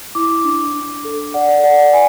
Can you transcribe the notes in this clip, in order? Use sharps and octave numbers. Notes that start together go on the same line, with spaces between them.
E4 D6
D4
D4
A4
D5 F#5
D5 F#5
G#5